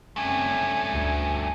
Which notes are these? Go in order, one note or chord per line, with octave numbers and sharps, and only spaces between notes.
F#1 G2 A3 C4 C#4 G#5
D2